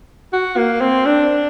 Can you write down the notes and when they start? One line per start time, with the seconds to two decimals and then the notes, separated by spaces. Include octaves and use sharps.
0.33 F#4
0.57 A#3
0.81 C4
1.06 D4